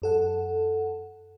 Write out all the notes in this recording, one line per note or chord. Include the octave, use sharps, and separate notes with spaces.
F#2 A4 F#5